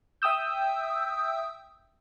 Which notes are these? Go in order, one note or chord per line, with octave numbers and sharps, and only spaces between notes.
E5 G5 D#6 E6 G6